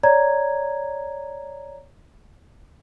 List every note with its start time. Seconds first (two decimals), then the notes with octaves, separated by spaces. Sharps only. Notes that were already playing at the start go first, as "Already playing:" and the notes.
0.03 C#5 D5 A#5 G#6